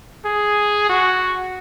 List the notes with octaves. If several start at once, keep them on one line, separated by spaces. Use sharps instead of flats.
G#4
F#4